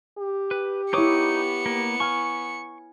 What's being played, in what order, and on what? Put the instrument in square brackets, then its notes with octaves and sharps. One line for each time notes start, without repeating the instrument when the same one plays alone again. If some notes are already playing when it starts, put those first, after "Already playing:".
[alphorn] G4
[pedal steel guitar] B4
[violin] B3 C#7 [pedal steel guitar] D#4 D6 D#6 [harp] E4 C#5
[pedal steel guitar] A#3
[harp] G#5 F6 [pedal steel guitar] C#6